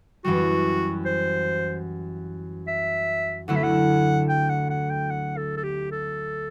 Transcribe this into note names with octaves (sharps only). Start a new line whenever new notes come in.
F#2 E3 G3 F#4
C5
E5
D2 D3 F#3 A3 E4 F#5
E5
F#5
G5
F#5
F#5
G5
F#5
A4
A4
G4
A4